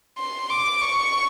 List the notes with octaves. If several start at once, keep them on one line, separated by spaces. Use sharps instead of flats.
C6
D6
C#6